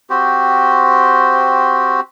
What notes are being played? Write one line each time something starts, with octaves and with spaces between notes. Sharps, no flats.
C4 F#4 G4 C5